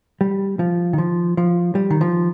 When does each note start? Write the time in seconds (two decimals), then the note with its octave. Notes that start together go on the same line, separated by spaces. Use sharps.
0.21 G3
0.59 F3
0.93 D#3
0.98 F3
1.37 F3
1.75 G3
1.91 D#3
2.01 F3